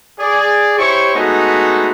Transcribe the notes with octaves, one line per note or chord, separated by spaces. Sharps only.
G#4 D5
E4 G4 C5 C#5 C#6
G#3 A3 B3 D#4 F#4 G#4